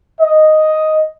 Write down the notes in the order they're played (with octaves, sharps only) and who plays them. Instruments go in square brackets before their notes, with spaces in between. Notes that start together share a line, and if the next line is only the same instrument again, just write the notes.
[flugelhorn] D#5